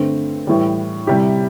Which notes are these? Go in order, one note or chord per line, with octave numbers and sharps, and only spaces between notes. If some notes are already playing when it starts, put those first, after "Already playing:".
Already playing: G2 D3 A3 C4
A2 E3 G3
C3 G3 E4 G4